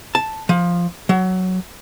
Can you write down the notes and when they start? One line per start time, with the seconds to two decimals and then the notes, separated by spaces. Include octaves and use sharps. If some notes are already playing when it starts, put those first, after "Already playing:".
0.15 A5
0.49 F3
1.09 F#3